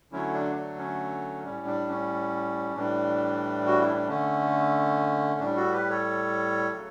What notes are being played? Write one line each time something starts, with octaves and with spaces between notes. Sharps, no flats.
D3 F#3 A3 C#4 E4
D4
D4
C#4
A2 G3 C#4
D4
C#4
A2 E3 G3 D4
F#4
E4
D4
D3 A3 C#4
A2 G3 D4
F#4 A4
G4 B4
A4 C#5
C#3 F#3 A3